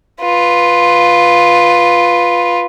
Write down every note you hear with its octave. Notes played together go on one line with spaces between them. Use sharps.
F4 B4